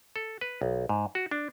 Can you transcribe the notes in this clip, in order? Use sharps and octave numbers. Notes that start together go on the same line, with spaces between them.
A4
B4
B1
G#2
F#4
D4